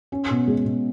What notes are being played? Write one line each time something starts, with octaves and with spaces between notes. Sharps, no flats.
C#4
B2
G#3
B2